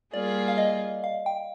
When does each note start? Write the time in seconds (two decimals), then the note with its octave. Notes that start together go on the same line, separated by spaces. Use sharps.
0.13 G3 A#3 F4 G#4 D5
0.48 F5
0.58 D#5
1.04 F5
1.26 G5